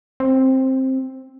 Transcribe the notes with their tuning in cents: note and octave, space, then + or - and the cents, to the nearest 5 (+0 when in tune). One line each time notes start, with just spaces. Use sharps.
C4 +10